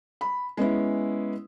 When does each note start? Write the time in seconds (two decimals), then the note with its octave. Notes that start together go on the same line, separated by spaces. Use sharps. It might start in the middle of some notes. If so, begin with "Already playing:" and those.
0.21 B5
0.57 G#3 B3 C#4 E4